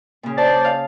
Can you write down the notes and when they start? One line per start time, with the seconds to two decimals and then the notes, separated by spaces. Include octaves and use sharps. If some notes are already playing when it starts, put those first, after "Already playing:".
0.23 A#2 C#3
0.38 C5 D5 A5
0.65 F5